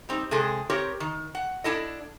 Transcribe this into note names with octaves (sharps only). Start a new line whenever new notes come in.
G3 C4 D#4
C3 G#3 G#4 A4
C4 G4 A#4 C#5
D#3
F#5
D4 E4 A4 D#5